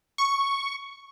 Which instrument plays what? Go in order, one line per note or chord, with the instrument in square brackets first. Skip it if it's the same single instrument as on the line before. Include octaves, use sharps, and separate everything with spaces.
[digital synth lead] C#6